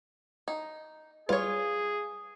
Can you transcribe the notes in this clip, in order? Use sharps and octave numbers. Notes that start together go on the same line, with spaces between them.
D#4
G3 F4 G#4 B4 C#5